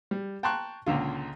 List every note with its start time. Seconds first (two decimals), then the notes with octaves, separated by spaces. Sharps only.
0.11 G3
0.43 G5 A5 A#5 C6 C#6 F#6
0.86 C#2 A#2 D3 F4